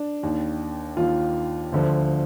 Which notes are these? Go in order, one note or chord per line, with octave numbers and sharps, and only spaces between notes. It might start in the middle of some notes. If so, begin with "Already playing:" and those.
Already playing: D4
D#2 D#3
D#2 D#3 F4
D2 D3 F3